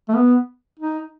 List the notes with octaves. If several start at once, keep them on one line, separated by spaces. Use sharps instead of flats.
A3
B3
D#4